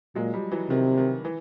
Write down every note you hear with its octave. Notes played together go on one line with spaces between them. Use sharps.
A#2 F#3 G#3
F3 G3
E3 F#3
C3 D#3
D#3
E3